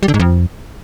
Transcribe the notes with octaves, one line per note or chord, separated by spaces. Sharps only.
G3
D3
G#2
F2